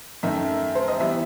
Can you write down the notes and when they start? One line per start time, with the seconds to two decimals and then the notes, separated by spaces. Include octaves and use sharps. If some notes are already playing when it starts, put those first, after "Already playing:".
0.23 F#2 D#3 A3 E5
0.75 C5
0.88 D#5
1.00 E3 G3 B3 E5